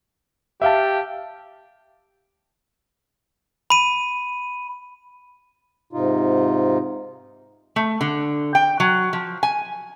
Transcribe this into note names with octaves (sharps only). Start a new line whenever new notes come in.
G4 E5 F5 A5
B5 D#7
G#2 C3 D#4 F4
A3
D3
G5
F#3
F3
G#5